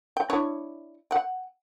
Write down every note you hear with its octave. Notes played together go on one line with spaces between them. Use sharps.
G5
D4 E4 C#5
F#5 G5